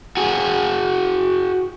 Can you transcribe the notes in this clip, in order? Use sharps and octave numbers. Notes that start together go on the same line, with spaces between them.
F#4 G#4